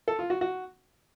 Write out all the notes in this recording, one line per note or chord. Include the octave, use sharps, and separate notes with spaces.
A4
F4
F#4
F#4